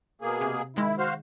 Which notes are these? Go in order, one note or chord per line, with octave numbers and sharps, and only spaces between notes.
B2 A#3 G#4
C3
D#3 G#3 E4
F#4 C5 F5